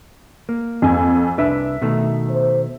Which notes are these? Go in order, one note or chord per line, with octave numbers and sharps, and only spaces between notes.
A#3
F2 G#5
C2 D4 B4 E5
B2 D#3 A3
C5